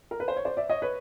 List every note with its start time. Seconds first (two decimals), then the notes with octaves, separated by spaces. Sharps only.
0.11 A#4
0.20 B4
0.28 C5
0.36 C#5
0.45 C5 D5
0.57 D5 E5
0.69 C#5 D#5
0.82 B4 C#5